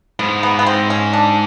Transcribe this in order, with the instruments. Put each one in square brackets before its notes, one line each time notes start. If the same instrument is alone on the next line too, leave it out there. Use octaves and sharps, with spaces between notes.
[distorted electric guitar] G#2 [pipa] B3
[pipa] B3
B3
C4
C#4
D4